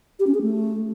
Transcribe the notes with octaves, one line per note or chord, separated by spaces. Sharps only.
G4
C#4
G#4
A3